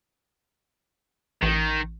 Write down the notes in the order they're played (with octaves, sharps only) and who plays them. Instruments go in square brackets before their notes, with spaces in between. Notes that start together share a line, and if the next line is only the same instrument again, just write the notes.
[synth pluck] A1 [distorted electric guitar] D#3